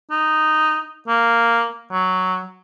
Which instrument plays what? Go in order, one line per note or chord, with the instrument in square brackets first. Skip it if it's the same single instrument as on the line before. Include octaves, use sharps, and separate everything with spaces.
[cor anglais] D#4
A#3
F#3